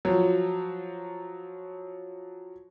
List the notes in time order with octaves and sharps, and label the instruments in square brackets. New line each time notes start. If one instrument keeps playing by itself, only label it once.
[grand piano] F3 F#3